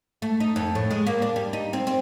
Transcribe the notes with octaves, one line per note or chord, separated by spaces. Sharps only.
A3
D#4
F2
A2
G#3
A#3
D4
G3
D#4
C4
C4